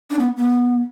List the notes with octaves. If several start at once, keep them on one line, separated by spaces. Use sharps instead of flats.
D4
B3
B3